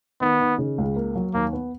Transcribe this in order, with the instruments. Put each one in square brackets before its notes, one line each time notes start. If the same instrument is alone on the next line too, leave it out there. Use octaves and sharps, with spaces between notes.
[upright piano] D#3 [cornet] B3
[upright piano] D#3
C#3
C#2
A#3
F#3
[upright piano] D#2 [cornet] A#3
[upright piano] B3